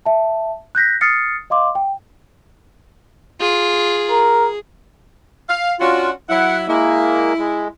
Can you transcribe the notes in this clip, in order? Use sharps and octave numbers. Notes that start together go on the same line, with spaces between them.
E5 A5
F#6 G6 A#6 B6
D#6 F6 A6 C7 C#7
D#5 F5 C6 D6
G5
F4 G#4
A#4
F5
C#4 D4 F4 F#4
F#3 E4 F#5
G#3 A#3 E4
G#3